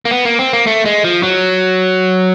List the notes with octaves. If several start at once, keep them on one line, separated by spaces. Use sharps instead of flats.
A#3
B3
A#3
C4
A#3
A3
G#3
F3
F#3